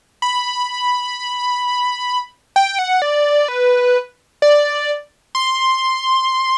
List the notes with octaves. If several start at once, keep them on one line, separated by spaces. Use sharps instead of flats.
B5
G5
F#5
D5
B4
D5
C6